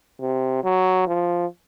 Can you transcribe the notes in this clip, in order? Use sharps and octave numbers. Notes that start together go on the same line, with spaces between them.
C3
F#3
F3